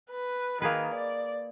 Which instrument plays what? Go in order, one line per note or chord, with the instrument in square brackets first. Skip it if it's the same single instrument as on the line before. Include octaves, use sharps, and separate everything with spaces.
[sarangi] B4
[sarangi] D#3 [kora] A#3 G#4 B4
[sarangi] D5